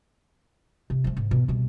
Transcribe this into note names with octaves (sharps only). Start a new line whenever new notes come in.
C3
F3 A3
G#2 D3
B2
C2 B2